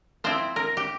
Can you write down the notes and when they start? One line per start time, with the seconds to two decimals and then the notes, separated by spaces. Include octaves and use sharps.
0.24 F3 C4 E4 C5
0.56 A#4
0.77 G4